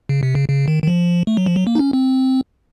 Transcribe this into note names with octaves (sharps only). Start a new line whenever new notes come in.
C#3
C3
C#3
C#3
D#3
D#3
F3
A3
F#3
F3
F#3
A#3
D#4
C#4
C4